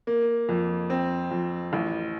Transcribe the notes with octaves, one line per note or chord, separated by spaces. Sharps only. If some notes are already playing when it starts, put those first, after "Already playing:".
A#3
F2
C4
F2
A1